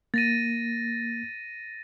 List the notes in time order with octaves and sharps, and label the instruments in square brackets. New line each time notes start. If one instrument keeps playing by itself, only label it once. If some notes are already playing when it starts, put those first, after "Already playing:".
[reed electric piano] A#3 [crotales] A6 A#6 D#7